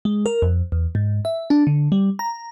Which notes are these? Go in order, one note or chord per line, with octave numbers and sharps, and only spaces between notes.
G#3
A#4
F2
E2
G#2
E5
D4
D3
G3
A#5